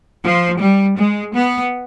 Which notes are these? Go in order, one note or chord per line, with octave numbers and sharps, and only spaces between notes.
F3
G3
G#3
B3